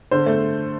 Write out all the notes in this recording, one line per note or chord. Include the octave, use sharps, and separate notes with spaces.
D3 C5
A3